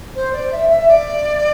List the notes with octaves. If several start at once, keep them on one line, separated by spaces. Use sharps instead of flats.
C5
D5
E5
E5
D5